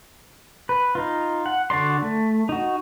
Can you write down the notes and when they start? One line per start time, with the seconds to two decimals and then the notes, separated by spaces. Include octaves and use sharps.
0.69 B4
0.95 D#4 F4
1.46 F#5
1.70 D3 F#4 D5 C6
2.02 A3
2.49 D#4 F#4